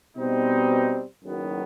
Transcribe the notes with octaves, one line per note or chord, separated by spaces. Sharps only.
B2 G3 C4 D#4
F#1 F#2 D#3 F#3 B3